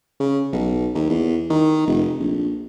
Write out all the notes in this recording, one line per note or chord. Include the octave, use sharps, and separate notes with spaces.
C#3
B1
D#2
E2
D#3
F1
A#1